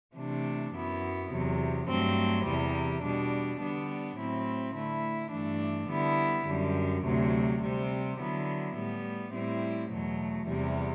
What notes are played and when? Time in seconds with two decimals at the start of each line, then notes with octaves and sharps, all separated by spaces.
0.16 C3 E3 A3 D4
0.74 F#2 F#3 B3 E4
1.30 E2 C3 F#3
1.88 G2 F#3 A3 C4
2.45 E2 C3 E3 G3
3.03 B2 G3 D4
3.59 D3 G3 B3 D4
4.17 A2 F#3 C4 E4
4.74 D3 A3 E4
5.32 G2 E3 A3 D4
5.90 D3 G3 B3 E4
6.46 F#2 D3 G3
7.04 D2 C3 F#3
7.61 C3 G3 C4
8.18 D3 F#3 B3 E4
8.76 A2 G3 B3
9.33 A2 G3 C4 E4
9.91 E2 B2 F#3 A3
10.47 E2 C3 E3 G3